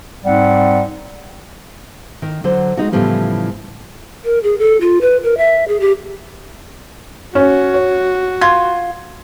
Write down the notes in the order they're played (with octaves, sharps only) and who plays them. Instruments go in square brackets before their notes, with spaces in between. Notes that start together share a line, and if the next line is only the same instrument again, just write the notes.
[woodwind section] G#2 G3 C4 F#5
[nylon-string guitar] D#3
D3 F#3 C5
G#3 D#4 F#4
A2 C#3 E3 F3 G3 B3
[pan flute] A#4
G#4
A4
F4
B4
A#4
E5
G#4
G4
[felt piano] C#4 C#5 [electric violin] F#4
[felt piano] C#5
[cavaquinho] F4 [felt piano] G#6